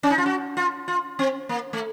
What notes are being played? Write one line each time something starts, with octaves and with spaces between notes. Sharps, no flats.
C#4
D#4
F4
F#4
F4
F4
C4
A#3
A3